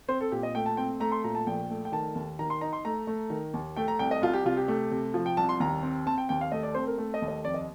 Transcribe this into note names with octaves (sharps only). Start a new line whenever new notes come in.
C4 C5
A4
A#2 G4
D#5
A3 G5
A5
C4 G5
A3 A#5
C6
A#2 A#5
A5
A#1 G5
A3
G5
D#3 A5
D#2
D#3 A#5
C6
D#4 A#5
C6
A3 A#5
A3
D#3
D#2
A3 G5
A#5
C2 G5
D#5
C2 F4
G4
C3 F4
G4
A3
C3
F3
G5
C2 A5
C6
D#2 A#5
C4
C4 A5
G5
D#2 G5
F5
A3 D#5
D5
C4 C5
A#4
A3
D#5
D#2
D#5
F2 D5
D#5